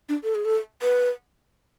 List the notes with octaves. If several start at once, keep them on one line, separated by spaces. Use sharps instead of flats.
D4
A4
G#4
A4
B4